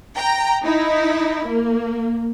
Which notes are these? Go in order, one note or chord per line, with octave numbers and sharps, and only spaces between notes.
G5 A#5
D#4 E4
A#3